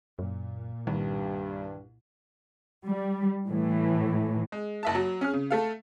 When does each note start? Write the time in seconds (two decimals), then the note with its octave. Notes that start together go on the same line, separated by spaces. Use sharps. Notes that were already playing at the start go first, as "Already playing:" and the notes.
0.19 F#2 A#2
0.87 C2 G2 D#3
2.88 G3
3.48 A2 E3
4.52 G#3
4.83 F#1 E5 A5
4.95 F#3
5.21 C#4 G#4 F6
5.34 C#3
5.51 A3 A4 F5